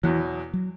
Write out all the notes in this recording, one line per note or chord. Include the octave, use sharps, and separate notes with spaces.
E2 B2 E3 F#3
F#3